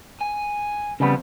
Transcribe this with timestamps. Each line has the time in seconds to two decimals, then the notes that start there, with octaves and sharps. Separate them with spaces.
0.21 G#5
1.00 F2 C#3 G3 B3